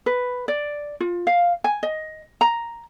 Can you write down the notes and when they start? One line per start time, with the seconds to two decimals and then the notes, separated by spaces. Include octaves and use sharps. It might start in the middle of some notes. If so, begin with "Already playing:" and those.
0.06 B4
0.48 D5
1.00 F4
1.27 F5
1.64 G#5
1.83 D#5
2.41 A#5